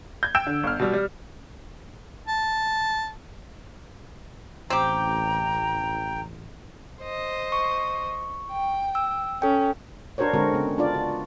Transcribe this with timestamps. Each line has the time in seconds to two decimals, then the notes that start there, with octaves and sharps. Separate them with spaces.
0.23 G6 G#6
0.35 G5 E6 G6 D7 E7
0.47 D3
0.63 G1 F6
0.79 B2 G3
0.94 G3
2.27 A5
4.70 A1 C4 G4 G5 A#5
7.02 C5 D#5
7.52 C#6
8.51 G5
8.95 E6
9.42 C#4 A4 G5
10.18 D4 F#4 A#4 C5 C#5
10.34 D3 G#3 C4 F#4 A#4
10.54 C#3 B3
10.78 D4 F4 D5
10.95 F#4